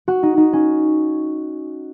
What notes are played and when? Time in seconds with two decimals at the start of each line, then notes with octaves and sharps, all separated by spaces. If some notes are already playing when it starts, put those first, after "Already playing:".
0.08 F#4
0.23 D#4
0.37 D#4
0.53 C#4